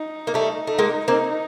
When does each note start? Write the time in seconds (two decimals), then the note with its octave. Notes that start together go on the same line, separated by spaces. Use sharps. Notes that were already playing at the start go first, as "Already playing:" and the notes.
Already playing: D#4
0.27 A#3
0.34 G3 A3
0.67 A3
0.78 G#3 A#3
1.08 A#3 C4